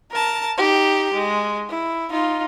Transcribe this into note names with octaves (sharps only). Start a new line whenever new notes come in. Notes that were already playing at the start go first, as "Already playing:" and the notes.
A#4 A5
D#4 G4
G#3
E4
D#4 F4